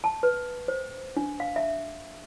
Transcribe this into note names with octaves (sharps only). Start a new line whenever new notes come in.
A5
B4
C5
D4
F5
E5